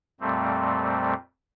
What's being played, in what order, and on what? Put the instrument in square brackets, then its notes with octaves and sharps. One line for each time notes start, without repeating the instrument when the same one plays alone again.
[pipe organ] F2 A#2 G3 A3 C4